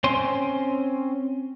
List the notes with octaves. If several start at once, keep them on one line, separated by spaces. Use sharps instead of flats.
C4 C#4 C6